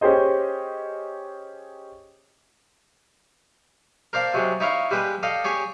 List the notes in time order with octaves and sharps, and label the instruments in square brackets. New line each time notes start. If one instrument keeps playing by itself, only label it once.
[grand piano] C#4 G4 G#4 C5 D#5
[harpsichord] A#4 C5 D5 F5 A5
C3 F#3 G#3 C4
D#4 E4 C#5 F5
G3 G#3 B4 G5 D#6
A4 D5 D#5 F5 G5
G4 G#4 C#5 D5